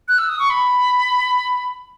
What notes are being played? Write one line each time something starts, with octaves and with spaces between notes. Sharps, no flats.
F#6
E6
D#6
C#6
B5